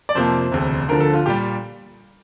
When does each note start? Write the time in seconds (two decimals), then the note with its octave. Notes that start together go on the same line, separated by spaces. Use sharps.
0.09 D5
0.15 F2 C3 F3 A#3 C5
0.52 E1 D2 C3
0.88 D2 D3 F3 A#4
1.00 A4
1.13 F4
1.26 A#2 G3 G4